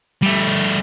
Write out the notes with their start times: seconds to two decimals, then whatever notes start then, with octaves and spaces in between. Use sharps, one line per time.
0.22 G3 A3